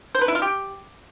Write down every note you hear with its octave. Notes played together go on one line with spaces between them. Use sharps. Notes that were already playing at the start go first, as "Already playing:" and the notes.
C5
B4
E4
F4
G4